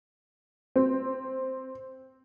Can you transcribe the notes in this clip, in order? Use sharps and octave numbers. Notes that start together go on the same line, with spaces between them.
C4